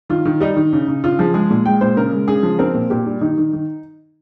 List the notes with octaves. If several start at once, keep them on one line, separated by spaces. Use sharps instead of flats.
D#3 F4
D#3
G3 D#4
D#3
C#3
C#3
C#3 F4
F3 G#4
G#3 G#4
A#2
G#3 G5
A#2 C5
C#3 A#4
G#3
C#3 G#4
F3
C4 A#4
A#2
A#2 G4
G3
D#3 D#4
D#3
D#3